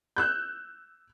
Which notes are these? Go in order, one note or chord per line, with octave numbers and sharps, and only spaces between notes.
E6 F#6 G6